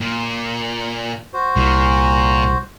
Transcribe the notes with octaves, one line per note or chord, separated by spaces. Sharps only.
A#2
F#4 C5
C2 A#2